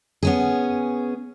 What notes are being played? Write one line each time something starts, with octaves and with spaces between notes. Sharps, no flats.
B3 C#4 G#4